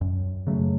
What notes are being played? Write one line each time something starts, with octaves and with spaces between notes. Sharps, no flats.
F#2
C#3 F#3 A3